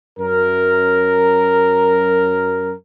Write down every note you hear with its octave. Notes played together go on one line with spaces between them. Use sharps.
F#2 A#4